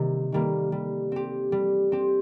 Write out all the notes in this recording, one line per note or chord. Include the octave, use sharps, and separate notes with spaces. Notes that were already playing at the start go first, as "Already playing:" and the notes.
Already playing: C3 D#3 G3 A#3
D#3 G3 A#3
G3
C4 G4
G3
C4 G4